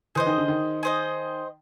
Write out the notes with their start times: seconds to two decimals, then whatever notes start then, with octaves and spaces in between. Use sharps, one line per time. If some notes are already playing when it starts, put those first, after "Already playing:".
0.15 E3 G#4 C5 D#5
0.26 D#3
0.38 D3
0.48 D#3
0.83 G#4 C5 D#5